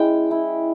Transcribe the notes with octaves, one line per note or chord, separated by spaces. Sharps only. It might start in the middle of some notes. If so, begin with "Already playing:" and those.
Already playing: G#3 C#4 E4 G5
E4